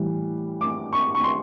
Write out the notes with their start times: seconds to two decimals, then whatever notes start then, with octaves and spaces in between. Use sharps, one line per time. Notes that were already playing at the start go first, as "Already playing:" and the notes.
Already playing: A2 E3 G3
0.61 D6
0.93 C#6
1.15 C#6
1.24 C6